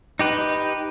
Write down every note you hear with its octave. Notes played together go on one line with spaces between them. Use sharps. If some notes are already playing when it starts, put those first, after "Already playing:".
D#4 G4 B4